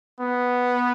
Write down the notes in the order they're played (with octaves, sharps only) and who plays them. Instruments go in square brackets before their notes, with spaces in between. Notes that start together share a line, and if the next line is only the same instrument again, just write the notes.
[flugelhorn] B3